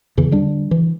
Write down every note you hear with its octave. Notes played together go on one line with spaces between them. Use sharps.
E2 C#3 E3
D3 G3 D4
E3